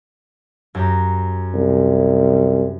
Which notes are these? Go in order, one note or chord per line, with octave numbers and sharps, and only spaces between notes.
F#2 G4 A#5
C2